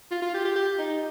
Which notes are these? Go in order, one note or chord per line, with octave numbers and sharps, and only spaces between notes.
F4
F4
G4
G4
G4
D#4